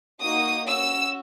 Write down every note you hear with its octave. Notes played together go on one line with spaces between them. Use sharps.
A#3 D#4 F#4 D#6
C#4 F#4 E6